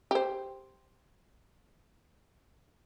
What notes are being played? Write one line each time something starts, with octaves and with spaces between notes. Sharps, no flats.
G4 C5